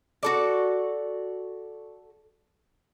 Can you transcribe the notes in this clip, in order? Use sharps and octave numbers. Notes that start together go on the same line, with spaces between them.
F#4 A4 D5